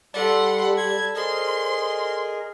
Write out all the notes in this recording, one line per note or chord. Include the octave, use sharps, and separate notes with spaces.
G3 A4 D5 F#5 A5 B5 C6
G#6
G#4 A#4 C5 D#5 C6